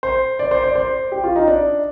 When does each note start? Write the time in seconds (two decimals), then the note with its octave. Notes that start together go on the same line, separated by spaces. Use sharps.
0.03 C5
0.39 D5
0.51 C5
0.64 D5
0.75 C5
1.12 G4
1.24 F4
1.36 D#4
1.48 D4